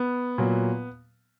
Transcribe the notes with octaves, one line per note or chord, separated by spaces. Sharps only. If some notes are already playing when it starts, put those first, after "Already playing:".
Already playing: B3
A#2 F#3